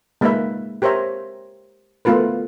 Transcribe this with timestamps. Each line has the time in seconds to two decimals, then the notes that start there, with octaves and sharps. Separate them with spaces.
0.21 G#3 A#3 D#4 A#4 B4 E5
0.82 G4 A#4 C5 C#5 E5 A#5
2.05 A3 B3 F4 A#4 B4